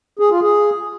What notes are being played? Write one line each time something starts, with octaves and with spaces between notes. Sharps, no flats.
G#4
F4
G#4